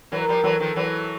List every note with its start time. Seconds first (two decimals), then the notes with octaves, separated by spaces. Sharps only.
0.12 E3 F#3 A#4
0.28 F3 G3
0.44 E3 F#3 A4
0.60 D#3 F3
0.76 E3 F#3